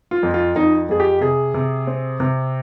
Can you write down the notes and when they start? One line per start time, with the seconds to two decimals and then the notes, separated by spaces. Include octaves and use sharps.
0.11 F4
0.23 F2
0.34 F4
0.55 F2 D#4
0.89 F2 G#4
1.00 G4
1.21 C3 G#4
1.54 C3
1.87 C4
2.20 C3